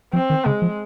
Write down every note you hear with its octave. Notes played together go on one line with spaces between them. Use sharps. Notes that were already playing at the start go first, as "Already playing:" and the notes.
F3 C4
D#3
C#3 G#3
F3